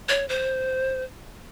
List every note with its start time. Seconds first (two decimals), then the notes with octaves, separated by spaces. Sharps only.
0.09 C#5
0.29 C5